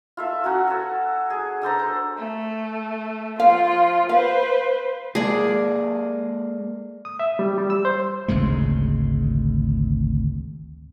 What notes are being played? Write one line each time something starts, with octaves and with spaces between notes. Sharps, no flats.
F4 A4 E5
F#3 C#4 F#4
A4 C#5
G#4
D4 A4 C5 A#5
C5
A3
F3 F4 F5
B4 C5 F5
G#3 A#3 G#4 A4 D5
D#6
E5
G3
G3
E6
C5
G#1 D2 C#3 G#3